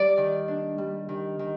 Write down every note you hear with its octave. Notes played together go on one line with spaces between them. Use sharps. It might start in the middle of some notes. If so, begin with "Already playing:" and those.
Already playing: G3 D5
D#3
D4
G3
D#3
D#3